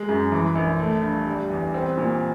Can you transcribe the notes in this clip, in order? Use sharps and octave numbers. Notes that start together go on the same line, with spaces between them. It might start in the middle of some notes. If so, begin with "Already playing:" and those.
Already playing: G#3
F#2
E3
A#1
A3
G2
G3
E2
C4
A#2